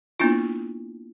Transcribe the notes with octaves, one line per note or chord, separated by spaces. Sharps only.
A#3 B3 D4 E4 F4